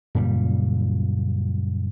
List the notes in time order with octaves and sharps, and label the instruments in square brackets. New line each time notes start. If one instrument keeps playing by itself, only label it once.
[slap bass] F#2 A#2 C#3 G3